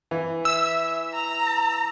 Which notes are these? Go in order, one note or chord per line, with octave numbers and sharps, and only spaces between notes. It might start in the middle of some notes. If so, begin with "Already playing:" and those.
E3
E5 E6
A#5